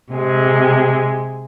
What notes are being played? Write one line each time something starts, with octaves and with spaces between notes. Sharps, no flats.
C3 G#3